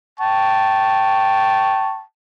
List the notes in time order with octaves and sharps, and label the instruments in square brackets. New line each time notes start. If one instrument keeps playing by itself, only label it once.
[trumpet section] G5 A5 C#6